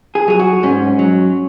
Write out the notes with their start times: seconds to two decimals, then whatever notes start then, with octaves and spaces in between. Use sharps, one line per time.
0.15 G#4
0.28 F#3 G#4
0.39 F#4
0.63 G#2 C#4
0.99 F#3